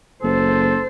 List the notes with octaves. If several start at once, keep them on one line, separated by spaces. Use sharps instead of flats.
F#1 A4 C5